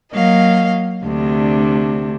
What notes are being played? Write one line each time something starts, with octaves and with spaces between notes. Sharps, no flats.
F#3 A#3 D#5 F5
D2 C3 D4